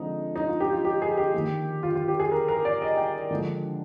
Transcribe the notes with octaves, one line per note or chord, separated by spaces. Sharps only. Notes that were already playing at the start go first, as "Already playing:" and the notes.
Already playing: D3 F3 G#3 C4 D#4
D#4
F4
G4
F4
G4
G#4
G4
D#3 A#3
F4
F4
G4
G#4
A#4
A#4
D5
D#5
G5
D3 F3 G#3